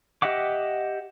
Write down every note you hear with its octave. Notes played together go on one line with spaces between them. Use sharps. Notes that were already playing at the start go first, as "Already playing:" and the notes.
G4 D#5 E5 F#5 D6